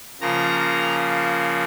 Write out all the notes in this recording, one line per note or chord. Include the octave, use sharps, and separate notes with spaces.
C#3 F3 A#3 A#5
A#5